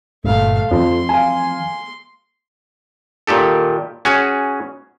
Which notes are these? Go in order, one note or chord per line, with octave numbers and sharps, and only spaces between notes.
G1 A#2 G3 A3 F5
F2 E3 F3 C4 C6
F5 G#5
A#2 D#3 G4 A4
C#4 F#4 G#4 C#5